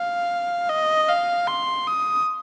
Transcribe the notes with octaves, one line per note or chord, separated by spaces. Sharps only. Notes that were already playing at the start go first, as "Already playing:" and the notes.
Already playing: F5
D#5
F5
C6
D#6